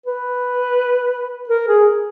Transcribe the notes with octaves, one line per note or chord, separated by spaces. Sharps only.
B4
A#4
G#4